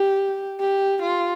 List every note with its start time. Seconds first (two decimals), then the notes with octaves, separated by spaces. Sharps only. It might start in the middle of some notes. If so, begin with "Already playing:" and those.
Already playing: G4
0.60 G4
1.02 F4